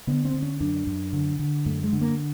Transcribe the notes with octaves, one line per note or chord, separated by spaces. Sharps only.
D3 B3
C4
D3
C#4
F#2 D4
F#2
D3
D3
F#2 A3
G#3
D3
A#3